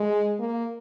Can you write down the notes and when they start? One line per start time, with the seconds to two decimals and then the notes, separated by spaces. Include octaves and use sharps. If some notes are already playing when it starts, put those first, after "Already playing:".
Already playing: G#3
0.40 A#3